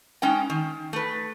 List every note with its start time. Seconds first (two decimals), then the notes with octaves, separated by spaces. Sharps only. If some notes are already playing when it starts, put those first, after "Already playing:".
0.22 G#3 C#4 D#4 G5
0.50 D#3
0.93 A3 B4